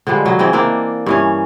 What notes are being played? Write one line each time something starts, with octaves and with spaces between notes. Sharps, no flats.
D3 F3 G3 G#3
F#3 D#5
C#3 E3 C4 D#5
E3 A#3 C4 D4
G2 E3 C#4